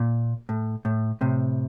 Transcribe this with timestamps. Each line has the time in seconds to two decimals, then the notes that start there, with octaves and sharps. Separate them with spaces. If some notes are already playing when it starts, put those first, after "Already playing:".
Already playing: A#2
0.49 A2
0.85 A2
1.21 A2 C3